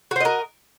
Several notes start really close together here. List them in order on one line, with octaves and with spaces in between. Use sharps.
F#4 C5 D#5 A#4